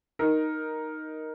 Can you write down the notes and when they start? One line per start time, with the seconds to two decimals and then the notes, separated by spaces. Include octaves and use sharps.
0.19 D#4 A#4